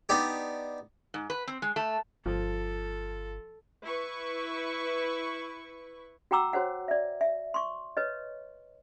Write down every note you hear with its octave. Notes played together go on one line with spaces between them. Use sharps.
B3 D4 D#4 G4
G#2
B4
C4
G#3
A3
G1 F3 A4
E4 B4 C#6
F#4 F#5 G5 A#5 D6 E6
F#4 C5 C#5 F#5
D5 E5
E5
C6 C#6
B4 C#5 D#5